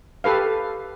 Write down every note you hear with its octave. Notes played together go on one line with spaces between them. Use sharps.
G4 A4 B4 F5